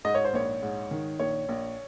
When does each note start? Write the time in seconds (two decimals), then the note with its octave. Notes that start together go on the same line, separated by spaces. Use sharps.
0.05 G#2 D#5
0.15 C#5
0.25 C5
0.33 A#1 C#5
0.63 G#2
0.91 D#3
1.20 A#1 C#5
1.49 A#1